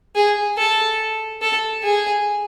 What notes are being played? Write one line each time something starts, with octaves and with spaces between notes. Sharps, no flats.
G#4
A4
A4
G#4